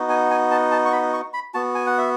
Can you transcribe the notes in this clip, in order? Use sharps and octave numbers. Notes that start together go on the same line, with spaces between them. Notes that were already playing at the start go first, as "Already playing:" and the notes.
Already playing: B3 D#4 F#4
G#5
G#5
A5
A5
C#6
B5
C#6
B5
B3 F#4 A5
G#5
F#5
E5